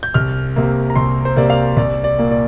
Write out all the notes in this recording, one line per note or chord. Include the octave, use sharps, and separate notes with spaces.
G6
C2 F6
C3 A#3
A#5
C2 C6
C5
C3 A#3 D5
F5
C2 D5
D5
A#2 A#3
D5